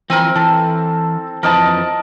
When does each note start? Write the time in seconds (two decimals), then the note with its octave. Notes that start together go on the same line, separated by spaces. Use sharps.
0.10 E3 F3 C4 A#4 G#5
0.35 E3 A4
1.43 F2 E3 F3 A#4 D#5 A5